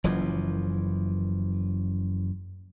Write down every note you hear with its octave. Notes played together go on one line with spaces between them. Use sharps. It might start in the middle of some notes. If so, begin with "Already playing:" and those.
F#1 F#2 E3 F3